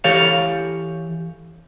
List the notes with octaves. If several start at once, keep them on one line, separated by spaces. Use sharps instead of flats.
E3 G4 A4 C#5 F5